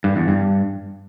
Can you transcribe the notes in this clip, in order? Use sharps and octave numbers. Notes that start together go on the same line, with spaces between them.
G2
E2
G2